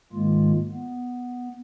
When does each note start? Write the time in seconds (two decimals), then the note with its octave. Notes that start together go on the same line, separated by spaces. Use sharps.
0.13 G#2 D#3 G#3 A#3 F4
0.73 B3